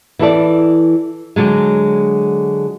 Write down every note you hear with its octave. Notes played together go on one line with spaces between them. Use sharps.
E3 E4 A4 D5
D3 F#3 G#3